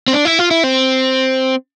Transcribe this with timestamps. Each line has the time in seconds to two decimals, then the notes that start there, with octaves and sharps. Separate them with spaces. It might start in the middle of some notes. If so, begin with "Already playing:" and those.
0.08 C4
0.13 D4
0.25 E4
0.39 F4
0.51 E4
0.64 C4